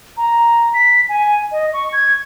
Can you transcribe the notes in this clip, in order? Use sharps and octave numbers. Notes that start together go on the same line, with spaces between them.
A#5
B6
G#5
D#5
C#6
G#6